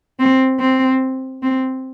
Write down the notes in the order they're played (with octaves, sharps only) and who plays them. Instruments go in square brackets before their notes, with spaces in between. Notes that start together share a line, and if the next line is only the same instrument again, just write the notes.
[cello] C4
C4
C4